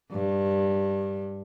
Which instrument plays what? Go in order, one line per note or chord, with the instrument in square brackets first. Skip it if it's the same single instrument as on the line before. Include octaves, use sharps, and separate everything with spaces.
[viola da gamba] G2